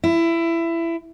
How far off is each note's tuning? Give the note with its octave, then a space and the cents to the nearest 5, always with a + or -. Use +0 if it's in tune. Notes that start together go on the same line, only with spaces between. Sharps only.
E4 +20